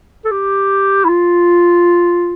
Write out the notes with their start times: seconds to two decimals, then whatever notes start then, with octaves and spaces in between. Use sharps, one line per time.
0.25 A4
0.31 G4
1.04 E4
1.09 F4